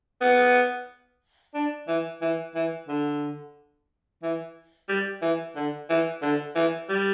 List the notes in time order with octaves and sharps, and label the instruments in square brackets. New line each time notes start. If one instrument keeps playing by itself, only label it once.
[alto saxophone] B3
D4
E3
E3
E3
D3
E3
G3
E3
D3
E3
D3
E3
G3